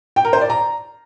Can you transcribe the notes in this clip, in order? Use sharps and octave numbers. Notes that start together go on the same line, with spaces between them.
G5
A#4
C5
D5
A#5